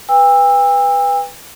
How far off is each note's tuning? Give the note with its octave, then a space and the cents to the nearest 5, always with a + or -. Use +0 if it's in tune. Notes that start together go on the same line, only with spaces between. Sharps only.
B4 +0 G5 +45 E6 +0